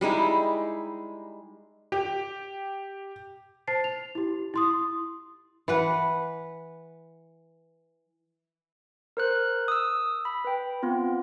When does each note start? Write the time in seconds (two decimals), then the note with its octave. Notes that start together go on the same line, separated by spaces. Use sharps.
0.01 G3 G#3 D#4 E4
1.92 G4
3.68 C5 A5 A6 C7
3.84 F7
4.15 E4 G4
4.54 E4 C6 D#6
5.68 E3 B4 F#5
9.17 A#4 C5 F#6
9.68 D#6 E6
10.25 B5
10.45 B4 G5
10.83 B3 C4 F4